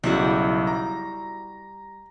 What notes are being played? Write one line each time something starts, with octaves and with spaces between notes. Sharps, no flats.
B1 C#3 F#3 G3 E4 F#4
A#5